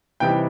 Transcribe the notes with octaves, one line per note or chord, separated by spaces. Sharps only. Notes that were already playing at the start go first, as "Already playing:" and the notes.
C3 E3 G3 C4 D#4 G5